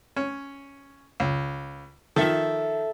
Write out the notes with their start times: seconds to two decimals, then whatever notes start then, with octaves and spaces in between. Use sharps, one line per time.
0.16 C#4
1.20 C#2
2.16 D#3 F3 A4 E5